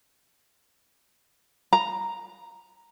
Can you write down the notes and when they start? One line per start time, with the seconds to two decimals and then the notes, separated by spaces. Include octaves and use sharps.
1.73 A#5